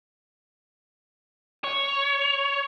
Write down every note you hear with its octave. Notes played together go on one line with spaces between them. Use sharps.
C#5